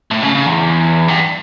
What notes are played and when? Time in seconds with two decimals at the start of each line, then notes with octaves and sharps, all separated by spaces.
0.11 A2
0.23 C#3
0.35 C#3
0.46 E2
1.08 G2